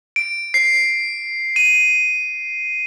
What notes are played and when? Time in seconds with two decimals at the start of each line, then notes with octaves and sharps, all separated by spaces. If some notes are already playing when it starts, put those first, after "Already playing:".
0.16 D7
0.54 C7
1.56 D#7